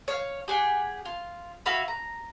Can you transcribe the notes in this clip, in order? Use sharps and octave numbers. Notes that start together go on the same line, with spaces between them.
C#5 F5
G4 G#4 F#5 G5
F4
E4 F#4 F5 B5
A#5